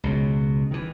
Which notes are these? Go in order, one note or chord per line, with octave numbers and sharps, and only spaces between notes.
C#2 B2
D#3 E3